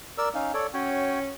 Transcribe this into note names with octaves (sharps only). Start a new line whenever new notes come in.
A#4 D5 E6
C#4 D#4 F5
A4 C#5 D5
C#4 F#4 C#5 G5